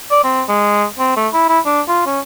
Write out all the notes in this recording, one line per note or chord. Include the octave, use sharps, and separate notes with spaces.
D5
C4
G#3
C4
A3
E4
E4
D4
F4
C#4